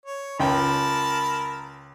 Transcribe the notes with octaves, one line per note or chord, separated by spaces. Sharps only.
C#5
C#2 A#4 G5 A5 B5